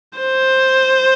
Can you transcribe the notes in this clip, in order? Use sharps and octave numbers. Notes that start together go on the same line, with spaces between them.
C5